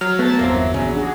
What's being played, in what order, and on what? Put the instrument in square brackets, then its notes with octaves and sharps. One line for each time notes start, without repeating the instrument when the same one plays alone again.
[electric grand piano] F#3 [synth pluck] F6
[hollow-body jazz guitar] A3 [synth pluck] B3 [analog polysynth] A5 A6
[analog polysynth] G1 E2 E5 [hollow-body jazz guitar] A#3 C4
[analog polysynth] A#1 [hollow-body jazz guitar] E2 C#3
[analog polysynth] D4 F#4 G#4